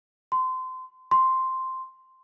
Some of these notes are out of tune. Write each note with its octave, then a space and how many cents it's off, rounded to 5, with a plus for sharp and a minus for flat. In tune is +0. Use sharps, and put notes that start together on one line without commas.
C6 -25
C6 +0